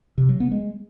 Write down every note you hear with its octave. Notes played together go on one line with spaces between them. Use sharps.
C3
F#3
B3
G#3